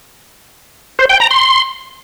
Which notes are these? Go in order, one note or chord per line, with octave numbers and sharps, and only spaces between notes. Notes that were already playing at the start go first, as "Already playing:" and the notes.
C5
G5
A#5
C6